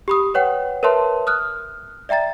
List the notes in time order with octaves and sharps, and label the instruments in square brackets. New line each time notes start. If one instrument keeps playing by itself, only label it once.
[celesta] G4 B5 D#6
B4 C#5 F#5 G5
A#4 B4 C#5 E5 A5 C6
D#6 F6 F#6
D5 E5 G5 A#5 A6